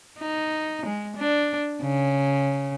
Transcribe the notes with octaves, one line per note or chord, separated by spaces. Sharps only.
D#4
G#3
D4
C#3